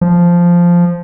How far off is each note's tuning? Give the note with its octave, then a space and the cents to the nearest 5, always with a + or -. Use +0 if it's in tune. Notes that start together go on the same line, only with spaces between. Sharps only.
F3 -5